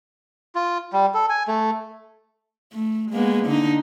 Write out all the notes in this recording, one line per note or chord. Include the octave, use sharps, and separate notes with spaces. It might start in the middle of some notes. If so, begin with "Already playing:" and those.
F4
G3
A4
G#5
A3
A3
G#3 A#3 B3
D3 D#4